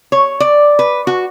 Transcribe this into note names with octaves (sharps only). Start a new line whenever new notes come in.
C#5
D5
B4
F#4